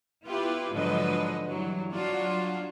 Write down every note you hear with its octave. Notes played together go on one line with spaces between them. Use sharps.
B3 E4 F4 G4 B4
G#2 D3 F3 F#3 B4 D#5
G2 E3 F#3
F#3 D4 F4 F#4